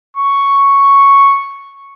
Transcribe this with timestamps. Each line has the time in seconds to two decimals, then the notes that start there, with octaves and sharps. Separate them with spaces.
0.17 C#6